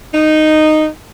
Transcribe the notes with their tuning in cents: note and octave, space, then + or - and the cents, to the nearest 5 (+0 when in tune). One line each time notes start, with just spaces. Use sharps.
D#4 -10